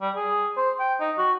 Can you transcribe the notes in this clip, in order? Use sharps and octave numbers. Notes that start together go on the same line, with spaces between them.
G3
G#4
C5
G5
D#4
F#4